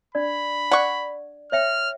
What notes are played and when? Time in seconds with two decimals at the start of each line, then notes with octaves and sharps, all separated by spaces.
0.15 D4 D5 B5
0.71 D5 F#5 C#6
1.52 C#5 E5 G5 F6